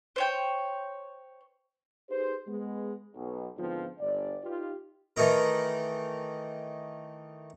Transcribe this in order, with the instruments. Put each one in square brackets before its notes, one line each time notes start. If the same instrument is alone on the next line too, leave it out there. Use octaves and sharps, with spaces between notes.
[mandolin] C5 C#5 G5
[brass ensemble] D#4 G4 G#4 B4 C5
G#3 B3
B1
G#2 D3 F3 B3 C4 F4
G1 D5
D#4 F4 G4 B4
[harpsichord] D#3 E3 A3 D#4 A#4